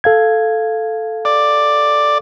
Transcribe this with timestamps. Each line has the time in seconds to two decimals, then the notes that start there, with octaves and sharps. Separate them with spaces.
0.04 A4 F5 G#6
1.25 D5